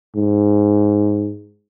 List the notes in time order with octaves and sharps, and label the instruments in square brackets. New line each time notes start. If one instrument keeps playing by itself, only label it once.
[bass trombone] G#2